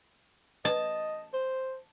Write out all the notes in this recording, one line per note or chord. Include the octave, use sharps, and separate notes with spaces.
D#5 A5
C5